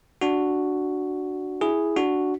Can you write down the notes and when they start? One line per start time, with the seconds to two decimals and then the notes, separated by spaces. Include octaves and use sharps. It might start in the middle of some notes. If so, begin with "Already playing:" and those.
0.21 D4 F#4
1.61 E4 G#4
1.97 D4 F#4